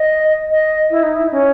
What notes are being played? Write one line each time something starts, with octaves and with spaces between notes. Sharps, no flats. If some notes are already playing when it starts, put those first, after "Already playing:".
Already playing: D#5
D#5
E4
D#4
E4
C#4